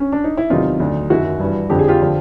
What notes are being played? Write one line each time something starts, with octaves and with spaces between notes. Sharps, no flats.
C#4
D4
D#4
E4
E2 C3 D#3 F#3 D#4 F4
D2 D3 F#3
F#2 D#3 F#3 E4 F#4
G2 E3
F2 D3 F3 G4
G#4
F4 G4
D3 F3